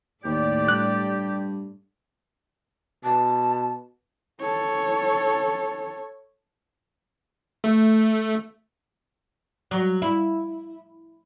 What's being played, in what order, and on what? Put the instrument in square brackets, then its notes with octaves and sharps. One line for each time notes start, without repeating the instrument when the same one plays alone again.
[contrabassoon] D#2 [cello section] A2 A3 D5 [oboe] G4
[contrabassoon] G2 [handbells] F#6
[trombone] B2 [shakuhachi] A5
[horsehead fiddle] A4 C#5
[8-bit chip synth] A3
[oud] F#3
E4